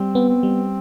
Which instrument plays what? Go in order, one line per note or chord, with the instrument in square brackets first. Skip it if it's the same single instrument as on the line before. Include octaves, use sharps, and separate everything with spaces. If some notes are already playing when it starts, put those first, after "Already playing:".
Already playing: [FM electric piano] G3 [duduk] C4
[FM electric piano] B3
[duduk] C4
[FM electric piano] G3